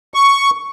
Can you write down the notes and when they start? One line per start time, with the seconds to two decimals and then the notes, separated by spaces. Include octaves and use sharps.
0.14 C#6